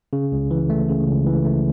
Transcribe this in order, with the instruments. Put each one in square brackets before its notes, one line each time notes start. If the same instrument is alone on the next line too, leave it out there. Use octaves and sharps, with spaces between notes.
[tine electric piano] C#3
C#2
E3
A3
C#3
C#2
E3
A3